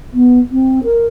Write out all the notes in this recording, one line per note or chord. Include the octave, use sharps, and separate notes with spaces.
B3
C4
A#4